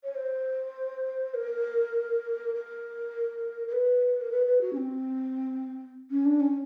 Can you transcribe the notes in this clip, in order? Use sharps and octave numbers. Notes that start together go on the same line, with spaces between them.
C#5
C5
A#4
A#4
A#4
B4
A#4
B4
B4
F#4
C#4
C4
C#4
D4
C#4